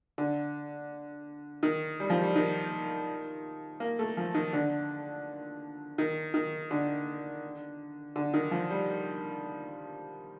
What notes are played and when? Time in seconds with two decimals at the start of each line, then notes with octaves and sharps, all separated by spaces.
0.18 D3
1.63 D#3
2.00 G3
2.10 F3
2.22 G3
2.36 D#3
3.80 A#3
3.99 A3
4.17 F3
4.35 D#3
4.53 D3
5.98 D#3
6.34 D#3
6.71 D3
8.16 D3
8.34 D#3
8.51 F3
8.70 G3